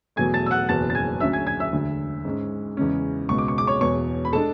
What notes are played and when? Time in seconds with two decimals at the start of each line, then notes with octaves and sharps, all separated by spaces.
0.16 E2 B2 F#3 A3 G#5 G#6
0.34 A5 A6
0.46 E6
0.51 F#5 F#6
0.69 F#1 E2 B2 F#3 B3 A5 A6
0.90 A6
0.95 G#5 G#6
1.20 D2 D3 F#3 C#4 E5 E6
1.33 G#5 G#6
1.47 G#5 G#6
1.60 E5 E6
1.73 E1 D2 D3
2.25 G#2 G#3 C#4
2.77 E2 C#3 G#3 C#4
3.29 C#2 B2 G#3 C#6
3.38 D6
3.48 C#6
3.58 D6
3.67 C#5 C#6
3.81 E1 E2 B2 C#5 C#6
4.25 B5
4.33 G#3 D4 A4 A5